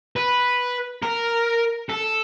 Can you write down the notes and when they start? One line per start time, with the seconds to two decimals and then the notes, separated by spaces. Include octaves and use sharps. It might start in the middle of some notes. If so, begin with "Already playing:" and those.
0.16 B4
1.03 A#4
1.90 A4